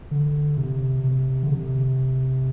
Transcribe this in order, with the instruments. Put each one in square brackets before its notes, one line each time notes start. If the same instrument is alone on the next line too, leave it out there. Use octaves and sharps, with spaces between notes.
[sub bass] D3
C3
C3
D3
C3